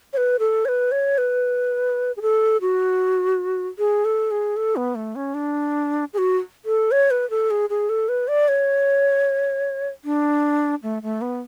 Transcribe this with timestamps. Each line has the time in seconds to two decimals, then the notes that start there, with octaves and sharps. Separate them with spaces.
0.13 C#5
0.17 B4
0.39 A4
0.65 C#5
0.68 B4
0.92 C#5
1.18 B4
2.17 G#4
2.22 A4
2.61 F#4
3.78 G#4
4.05 A4
4.31 G#4
4.56 A4
4.76 B3
4.95 A3
5.16 C#4
5.34 D4
6.13 G#4
6.18 F#4
6.65 A4
6.91 C#5
7.11 B4
7.30 A4
7.51 G#4
7.70 G#4
7.89 A4
8.09 B4
8.28 D5
8.48 C#5
10.05 D4
10.83 A3
11.03 A3
11.21 B3